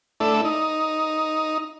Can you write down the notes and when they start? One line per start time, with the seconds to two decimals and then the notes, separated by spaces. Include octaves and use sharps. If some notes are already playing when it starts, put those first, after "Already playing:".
0.20 A3 D4 E4 A4
0.45 D#4